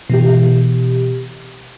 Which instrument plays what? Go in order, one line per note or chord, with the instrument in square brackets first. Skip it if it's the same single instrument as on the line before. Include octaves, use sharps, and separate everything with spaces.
[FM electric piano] B2 E3 G4